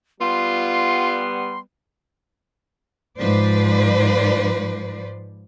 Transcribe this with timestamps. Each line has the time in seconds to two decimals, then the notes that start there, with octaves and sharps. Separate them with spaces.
0.21 G3 B3 F4 C6
3.18 G#2 F3 B4 C5 D5